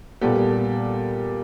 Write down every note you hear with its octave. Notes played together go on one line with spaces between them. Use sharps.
A#2 G3 B3 G4 A4